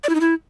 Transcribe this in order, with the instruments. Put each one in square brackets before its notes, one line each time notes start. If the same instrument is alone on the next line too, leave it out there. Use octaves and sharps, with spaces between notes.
[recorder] D5
E4
D#4
E4